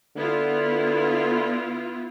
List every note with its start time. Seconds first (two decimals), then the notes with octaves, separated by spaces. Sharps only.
0.17 D3 B3 E4 F4